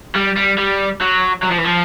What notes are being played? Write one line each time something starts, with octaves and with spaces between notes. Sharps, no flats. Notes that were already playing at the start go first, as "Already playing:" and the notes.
G3
G3
G3
F#3
F#3
F3
E3
F3